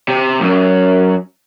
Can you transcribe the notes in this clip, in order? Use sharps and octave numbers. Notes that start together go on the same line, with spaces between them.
C3
C#2 F#2